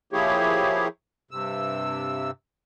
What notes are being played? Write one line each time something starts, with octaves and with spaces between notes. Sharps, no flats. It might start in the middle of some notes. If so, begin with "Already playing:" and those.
F3 A#3 E4 G4 G#4 C#5
G2 C3 E6